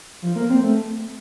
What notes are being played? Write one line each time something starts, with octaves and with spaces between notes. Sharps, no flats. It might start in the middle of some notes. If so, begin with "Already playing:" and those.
F3
A#3
C4
A3